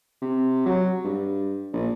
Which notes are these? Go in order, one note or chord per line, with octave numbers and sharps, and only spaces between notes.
C3
F#3
G2
A#1